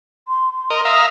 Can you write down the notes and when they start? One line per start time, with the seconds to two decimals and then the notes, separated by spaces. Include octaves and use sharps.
0.28 C6
0.56 C6
0.70 A#4 D#5
0.85 E5 F5 A#5 D#6